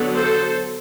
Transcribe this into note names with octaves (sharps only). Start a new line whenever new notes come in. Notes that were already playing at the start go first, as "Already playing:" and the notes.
Already playing: D3 F#3 B3
A4 C5